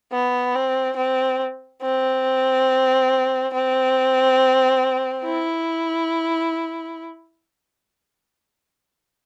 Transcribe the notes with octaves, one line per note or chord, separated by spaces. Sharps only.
B3
C4
C4
C4
C4
E4